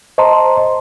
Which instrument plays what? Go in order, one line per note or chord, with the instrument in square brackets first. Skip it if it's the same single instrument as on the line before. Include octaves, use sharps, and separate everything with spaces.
[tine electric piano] C5 D#5 A5 A#5 C6